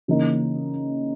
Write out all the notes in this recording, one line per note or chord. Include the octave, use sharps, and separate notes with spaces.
C#3 E3 A#3 D#4